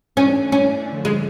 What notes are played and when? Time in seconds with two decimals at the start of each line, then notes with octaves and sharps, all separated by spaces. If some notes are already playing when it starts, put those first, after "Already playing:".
0.16 E3 A3 C#4 D4
0.52 C#4
0.87 F#2 D3 F3 A3
1.05 G#3